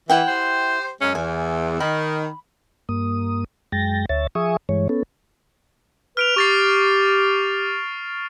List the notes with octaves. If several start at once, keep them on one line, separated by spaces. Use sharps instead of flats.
E3 E4 F#5 G5
G4 C5
F#2 G#3 C#4
E2 G#5
D#3 B5
G2 A#3 D#6
F#2 G#3 G5 A6 A#6
D2 C#5 E5 A6
F3 G#4 E5 G#5 C#6 D#6
G2 E3 G#3 C#5
B3 C#4 A4
B4 F6 D7 F7
G4 C#6 A6 C7